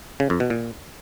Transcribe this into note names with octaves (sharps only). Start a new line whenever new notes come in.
C#3
F2
B2
A#2